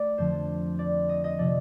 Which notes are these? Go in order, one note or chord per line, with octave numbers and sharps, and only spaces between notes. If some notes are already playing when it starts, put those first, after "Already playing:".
Already playing: A3 D5
F2 D3 F3 C5
D5
D#5
D#5
C3 F3 D5